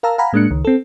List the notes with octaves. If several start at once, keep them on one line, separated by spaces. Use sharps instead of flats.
A#4 F5 A5 A#5 E6
F5 F#5 G#5 A#5 B5
A2 G#3 A#3 D4 F#6 C#7
C#2 D#3
C4 A4